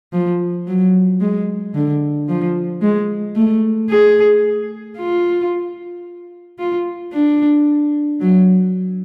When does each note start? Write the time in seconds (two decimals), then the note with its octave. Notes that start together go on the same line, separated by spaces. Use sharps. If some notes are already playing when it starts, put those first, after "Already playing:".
0.13 F3
0.67 F#3
1.21 G#3
1.74 D3
2.28 F3
2.81 G#3
3.36 A3
3.90 G#4
4.97 F4
6.59 F4
7.12 D4
8.20 F#3